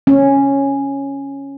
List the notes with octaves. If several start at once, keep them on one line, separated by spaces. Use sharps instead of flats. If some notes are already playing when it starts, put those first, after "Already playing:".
C#4